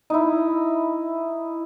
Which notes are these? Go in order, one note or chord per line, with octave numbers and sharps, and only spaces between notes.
D#4 E4